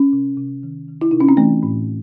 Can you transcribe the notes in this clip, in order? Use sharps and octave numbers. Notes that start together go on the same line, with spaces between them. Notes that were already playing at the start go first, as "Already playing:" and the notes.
Already playing: C#4
C3
C3
D#3
D#3
E4
C3 D#4
C#4
C4
E3 A3
A2